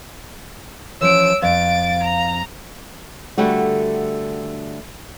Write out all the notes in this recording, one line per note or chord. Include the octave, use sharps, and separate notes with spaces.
E3 F3 C#4 C#5 E6 D7
F2 F5 A6 D7
A#5
D3 G3 A3 F#4